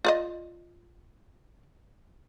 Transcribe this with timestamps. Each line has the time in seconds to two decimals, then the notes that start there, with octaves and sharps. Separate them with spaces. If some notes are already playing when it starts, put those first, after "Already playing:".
0.05 F4 D5 D#5